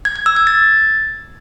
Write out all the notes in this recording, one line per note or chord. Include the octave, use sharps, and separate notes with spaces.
G#6
G#6
E6
G#6
A6